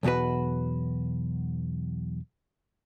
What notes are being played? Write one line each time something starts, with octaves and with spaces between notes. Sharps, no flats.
B1 E2 B2 F#4 B4